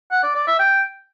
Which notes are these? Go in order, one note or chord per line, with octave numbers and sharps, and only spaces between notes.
F#5
D5
D5
E5
G5